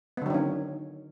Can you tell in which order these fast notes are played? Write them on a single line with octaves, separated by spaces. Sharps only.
B3 D3 F#3 D#3 C#4